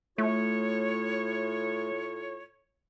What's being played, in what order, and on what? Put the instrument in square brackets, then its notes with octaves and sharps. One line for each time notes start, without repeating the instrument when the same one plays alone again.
[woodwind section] A2 F4 C#5 [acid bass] A3